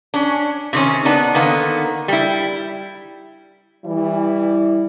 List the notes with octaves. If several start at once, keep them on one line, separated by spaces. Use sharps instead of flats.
C#4 D4
C3 D#3 C#4
B3 D4 D#4
D3 D#3 A#3 B3
G3 E4
E3 G3 E4